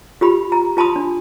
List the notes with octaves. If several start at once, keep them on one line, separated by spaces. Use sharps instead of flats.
F4 G4 B5
A#5
F4 A5 B5 C6 D#6
D4